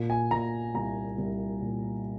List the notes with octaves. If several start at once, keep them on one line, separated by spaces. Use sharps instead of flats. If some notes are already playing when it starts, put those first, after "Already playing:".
Already playing: A#2
G#5
A#2 A#5
C2 A#5
C2
A#2